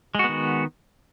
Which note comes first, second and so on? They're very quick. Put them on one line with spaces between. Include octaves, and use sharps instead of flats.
G#3 F#4 B3 D#3